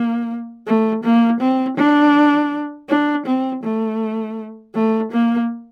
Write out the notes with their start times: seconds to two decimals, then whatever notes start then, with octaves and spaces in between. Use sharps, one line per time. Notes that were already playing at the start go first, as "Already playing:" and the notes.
Already playing: A#3
0.67 A3
1.04 A#3
1.41 C4
1.78 D4
2.89 D4
3.26 C4
3.63 A3
4.75 A3
5.12 A#3